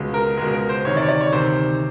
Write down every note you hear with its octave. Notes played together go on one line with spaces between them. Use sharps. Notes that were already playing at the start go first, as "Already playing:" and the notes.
Already playing: C#2 B2 G#3
A#4
C#2 B2 G#3 A#4
A#4
C5
D2 C3 D#3 C#5
D5
C#5
D5
C#5
D2 C3 D#3 C5